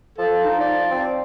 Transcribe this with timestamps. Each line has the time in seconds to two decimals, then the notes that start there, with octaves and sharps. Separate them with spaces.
0.18 F3 A4
0.44 D#4
0.60 D5
0.91 C4